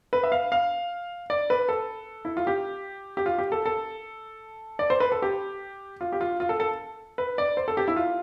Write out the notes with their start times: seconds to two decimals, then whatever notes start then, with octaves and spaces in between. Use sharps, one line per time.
0.13 B4
0.23 E5
0.32 F5
0.52 F5
1.30 D5
1.50 B4
1.69 A4
2.25 E4
2.37 F4
2.47 G4
3.17 G4
3.26 F4
3.38 G4
3.52 A4
3.66 A4
4.79 D5
4.90 C5
5.00 B4
5.12 A4
5.22 G4
6.01 F4
6.12 G4
6.21 F4
6.40 F4
6.49 A4
6.60 A4
7.18 B4
7.38 D5
7.57 C5
7.68 A4
7.77 G4
7.88 E4
7.96 F4